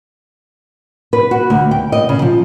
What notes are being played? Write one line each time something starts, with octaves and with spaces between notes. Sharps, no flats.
B4
F#4
D2
G5
D#5
C#3
F3